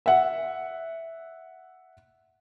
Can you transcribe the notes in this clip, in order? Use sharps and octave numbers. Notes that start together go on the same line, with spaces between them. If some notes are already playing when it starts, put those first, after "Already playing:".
E5 F#5